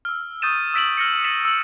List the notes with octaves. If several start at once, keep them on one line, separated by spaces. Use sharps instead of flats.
E6 F6
C#6 D#6 G6 A6 D#7 E7
E6 A6 B6 D7 E7 F#7
F6 A#6 C#7
A6 B6 C#7 D#7 E7 F#7
E6 F#7